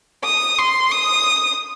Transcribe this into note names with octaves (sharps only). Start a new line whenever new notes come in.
D#6
C6
D#6